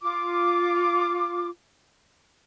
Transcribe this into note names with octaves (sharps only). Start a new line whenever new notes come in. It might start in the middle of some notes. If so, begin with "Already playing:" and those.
F4 D6